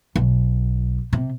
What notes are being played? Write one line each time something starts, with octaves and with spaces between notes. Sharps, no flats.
B1
C3